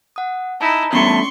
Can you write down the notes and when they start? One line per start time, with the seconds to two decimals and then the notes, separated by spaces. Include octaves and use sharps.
0.16 F#5 D#6
0.61 D#4 E4 A5 A#5
0.93 E2 G2 A3 C#4 C6 C#6